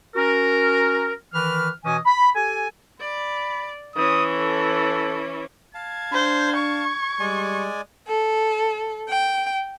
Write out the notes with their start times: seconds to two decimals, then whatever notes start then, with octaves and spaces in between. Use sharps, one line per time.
0.15 C#4 F#4 A#4
1.34 D#3 E3 B4 F6
1.84 B2 E3 C#4 D#5 G#5
2.06 B5
2.35 G4 A4 G#5
3.00 D5 B5
3.96 E3 C#4 D#6
4.34 A4
5.74 F5 A5 G#6
6.13 D4 C5
6.56 C#6
7.20 G3 G#3 D5 G#5
8.07 A4
9.08 G5